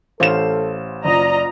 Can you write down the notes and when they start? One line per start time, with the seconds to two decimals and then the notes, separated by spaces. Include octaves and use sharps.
0.20 A1 A4 C5 F5 E7
1.05 F#1 F4 D5 D#5 A#5